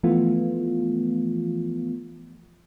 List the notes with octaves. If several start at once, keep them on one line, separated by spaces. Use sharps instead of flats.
E3 F3 A3 B3 F4